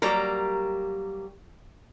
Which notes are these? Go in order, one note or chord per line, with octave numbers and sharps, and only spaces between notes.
F#3 G3 A#3 G4 A#4